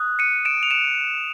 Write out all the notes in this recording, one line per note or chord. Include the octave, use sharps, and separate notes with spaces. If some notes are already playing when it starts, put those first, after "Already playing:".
Already playing: D#6 F#6
C#7 D#7
D7 E7
F7
D7 E7